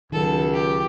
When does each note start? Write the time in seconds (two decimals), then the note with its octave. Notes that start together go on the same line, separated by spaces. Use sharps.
0.12 C#2 D#3 F#3 A4
0.53 G4